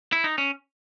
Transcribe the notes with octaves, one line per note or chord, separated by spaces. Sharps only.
E4
D#4
C#4